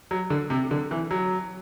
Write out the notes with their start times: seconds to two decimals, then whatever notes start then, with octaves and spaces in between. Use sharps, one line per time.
0.11 F#3
0.30 D3
0.50 C3
0.71 D3
0.91 E3
1.11 F#3